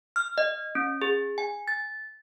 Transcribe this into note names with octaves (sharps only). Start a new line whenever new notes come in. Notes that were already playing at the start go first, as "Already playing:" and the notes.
F6
D#5
C#4
G#4
G#5
A6